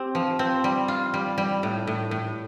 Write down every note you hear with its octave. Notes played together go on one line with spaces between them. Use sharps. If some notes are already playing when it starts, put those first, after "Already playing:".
Already playing: C4 G4
F3
C4
G3
F4
G3
G3
A2
A2
A2